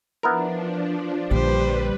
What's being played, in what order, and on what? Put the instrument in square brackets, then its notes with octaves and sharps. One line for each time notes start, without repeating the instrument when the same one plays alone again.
[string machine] F3 D4 [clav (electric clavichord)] B3 E4 A#4
[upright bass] A#1 D3 [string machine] G3 B4 [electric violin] G4 C5